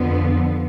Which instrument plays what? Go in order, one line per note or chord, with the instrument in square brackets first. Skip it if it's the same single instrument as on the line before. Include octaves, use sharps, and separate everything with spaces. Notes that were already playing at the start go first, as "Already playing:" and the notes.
Already playing: [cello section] F2 D3 F3 B3